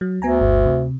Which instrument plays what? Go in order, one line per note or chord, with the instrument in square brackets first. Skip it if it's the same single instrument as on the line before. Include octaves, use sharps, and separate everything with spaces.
[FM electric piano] F#3
[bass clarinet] D2 [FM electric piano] B3 G#5 A#5
[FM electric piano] G1
C3